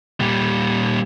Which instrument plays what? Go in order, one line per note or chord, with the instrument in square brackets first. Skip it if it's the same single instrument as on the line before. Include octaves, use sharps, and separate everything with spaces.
[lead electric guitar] A#2 G3